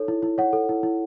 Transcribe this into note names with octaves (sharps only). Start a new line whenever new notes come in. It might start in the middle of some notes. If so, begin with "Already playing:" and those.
Already playing: D#4 A4 C#5
E4
E4
C#5 F#5
A4
E4
E4